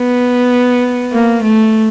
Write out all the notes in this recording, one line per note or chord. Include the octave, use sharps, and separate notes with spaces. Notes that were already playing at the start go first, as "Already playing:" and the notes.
Already playing: B3
A#3
A3